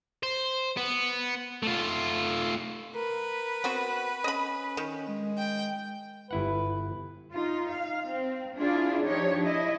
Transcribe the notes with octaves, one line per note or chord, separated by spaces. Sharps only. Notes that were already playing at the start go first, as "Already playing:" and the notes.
C5
B3
A3 F4
A#4 B4
B3 C4 F#4
C#4 D#5 B5
D#3
G#3
G5
G1 E4 B4 F#5
D#4 F4
F5
C4
D4 E4 F4 G#4 D5
F3 D4 D#4 G4 C#5
E4 D#5